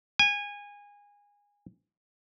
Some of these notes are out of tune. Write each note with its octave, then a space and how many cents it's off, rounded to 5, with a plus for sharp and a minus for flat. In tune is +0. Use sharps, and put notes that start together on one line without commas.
G#5 -25